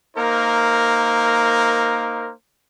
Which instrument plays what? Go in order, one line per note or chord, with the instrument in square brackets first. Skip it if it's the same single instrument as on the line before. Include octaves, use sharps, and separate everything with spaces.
[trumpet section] A#3 D#4 A#4 C5